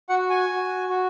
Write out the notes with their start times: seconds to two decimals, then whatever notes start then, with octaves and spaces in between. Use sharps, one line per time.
0.09 F#4 F#5
0.30 G#5
0.49 F#4
0.89 F#4